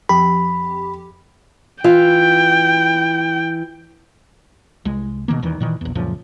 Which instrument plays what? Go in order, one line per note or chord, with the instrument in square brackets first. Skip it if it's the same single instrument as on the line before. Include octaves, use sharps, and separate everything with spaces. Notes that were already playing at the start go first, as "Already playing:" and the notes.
[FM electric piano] F2 G4 [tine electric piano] B5
[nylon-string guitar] E3 F4 [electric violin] G5
[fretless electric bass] C2 G#3
B2 D#3 G#3 A#3
D#1 E2 D#3 E3
A#2 D#3 E3
A#1 E2
C#2 F#2 A#2 F3